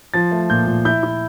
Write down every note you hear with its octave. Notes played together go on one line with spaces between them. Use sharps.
F3 A6
A3
A#2 G6
A#2
E4 G6
E4